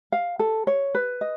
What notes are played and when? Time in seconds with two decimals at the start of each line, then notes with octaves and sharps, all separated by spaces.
0.12 F5
0.39 A4
0.67 C#5
0.95 B4
1.21 D#5